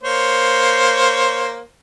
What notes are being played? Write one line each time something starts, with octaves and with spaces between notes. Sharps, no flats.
A#3 C5 C#5